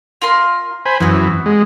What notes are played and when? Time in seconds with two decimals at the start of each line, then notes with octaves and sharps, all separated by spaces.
0.22 F4 A#4 C6
0.86 C5 G#5 B5
1.00 F#2 E3 B3 C4 F#4
1.46 G#3